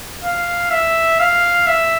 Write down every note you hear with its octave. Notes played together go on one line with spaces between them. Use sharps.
F5
E5
F5
E5